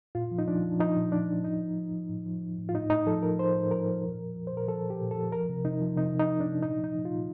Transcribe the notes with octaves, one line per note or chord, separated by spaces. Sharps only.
A#2 F4
F3
D#4
F3 D4
F3
F3 D#4
A#2
F3 D4
F3
A2 D#4
F3
F3
F3
A2
F3
F3
A2
F4
A2 D#4
A2 D#4
F3 A4
F3 A#4
F3 C5
A2
F3 A#4
F3
A#2
F3
F3
C5
A#2
A#4
F3 A4
F3
G4
A#2
A4
F3
F3 A#4
C3
C3 D#4
F3
C3 D#4
C3
D#4
C3
D4
C3
A#2 D#4
F3
D#4
F3
A#2 F4